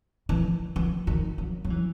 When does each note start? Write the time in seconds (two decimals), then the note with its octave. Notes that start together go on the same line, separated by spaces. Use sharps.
0.29 E3
0.76 E3
1.07 D#3
1.38 F#3
1.65 F#3
1.70 E3